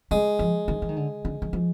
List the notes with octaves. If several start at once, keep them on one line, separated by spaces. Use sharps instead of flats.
G3 G#3
F3
D#3
E3
D#3
D3
D3
E3
F3